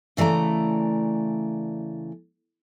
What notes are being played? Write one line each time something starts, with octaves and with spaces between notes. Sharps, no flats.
C#3 E3 A3 D5 A#5